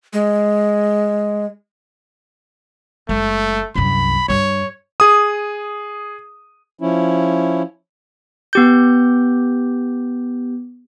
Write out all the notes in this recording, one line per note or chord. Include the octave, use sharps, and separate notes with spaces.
G#3
F#1 G#3 A3
C2 F#2 B5
G2 G3 C#5
G#4 D#6
F3 C#4 E4
B3 G4 G6